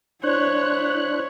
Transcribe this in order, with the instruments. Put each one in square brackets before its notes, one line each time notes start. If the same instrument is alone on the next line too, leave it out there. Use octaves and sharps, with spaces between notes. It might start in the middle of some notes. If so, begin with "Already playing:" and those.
[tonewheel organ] D4 C5 F#6 [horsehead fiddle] E4 C#5